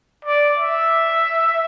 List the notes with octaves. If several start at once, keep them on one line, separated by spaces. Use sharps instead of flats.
D5
E5